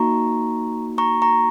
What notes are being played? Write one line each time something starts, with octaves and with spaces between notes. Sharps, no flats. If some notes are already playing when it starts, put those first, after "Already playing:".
Already playing: A#3 D#4 F#4 A#5 C#6
A#5 C#6
A#5 C#6